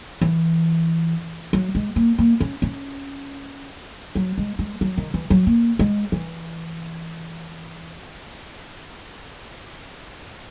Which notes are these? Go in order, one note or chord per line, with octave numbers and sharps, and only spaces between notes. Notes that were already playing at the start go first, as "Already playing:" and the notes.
E3
F#3
G#3
A#3
A#3
C#4
C#4
F#3
G#3
G#3
F#3
D#3
E3
F#3
A#3
G#3
E3